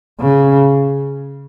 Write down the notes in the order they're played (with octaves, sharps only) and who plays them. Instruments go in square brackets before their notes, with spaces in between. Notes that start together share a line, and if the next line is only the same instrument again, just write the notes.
[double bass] C#3